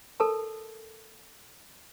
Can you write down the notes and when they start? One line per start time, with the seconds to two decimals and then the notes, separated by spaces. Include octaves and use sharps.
0.20 A4 A#4 A5